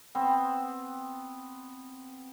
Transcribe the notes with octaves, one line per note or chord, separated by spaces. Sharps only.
B3 C4